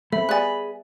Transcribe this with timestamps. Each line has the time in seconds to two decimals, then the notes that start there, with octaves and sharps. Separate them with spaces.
0.13 A3 C4 E5 B5
0.29 G3 B3 G#4 G#5 F#6 A6